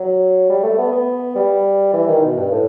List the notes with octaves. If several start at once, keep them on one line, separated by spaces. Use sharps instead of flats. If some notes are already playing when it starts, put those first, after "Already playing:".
Already playing: F#3
G3
A3
B3
B3
G3
E3
D#3
B2
G2
A2